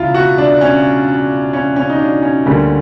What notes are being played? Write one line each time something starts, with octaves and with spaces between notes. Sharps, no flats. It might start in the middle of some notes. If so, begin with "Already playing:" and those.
Already playing: E1 C#3 E4 F4
F#4
D4
C#4
C#4
C#4
D#4
D4
C#4
D2 D3 G3 A#3 C#4